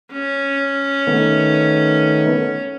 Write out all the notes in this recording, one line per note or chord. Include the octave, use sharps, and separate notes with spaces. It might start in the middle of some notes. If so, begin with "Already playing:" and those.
C#4
D#3 A3 B3